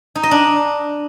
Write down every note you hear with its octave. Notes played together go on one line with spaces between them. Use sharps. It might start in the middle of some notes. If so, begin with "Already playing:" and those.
D#4
D#5
D4